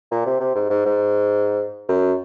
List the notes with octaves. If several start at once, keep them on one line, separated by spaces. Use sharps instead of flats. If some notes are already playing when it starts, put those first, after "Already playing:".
A#2
C3
C3
G#2
G#2
G#2
F#2